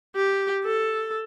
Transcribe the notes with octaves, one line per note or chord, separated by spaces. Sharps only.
G4
A4